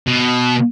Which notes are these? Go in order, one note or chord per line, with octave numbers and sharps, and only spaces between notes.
B2